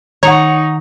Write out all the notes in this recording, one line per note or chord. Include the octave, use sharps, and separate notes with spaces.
D#3 D#4 C#5 F#5 A#5 C#6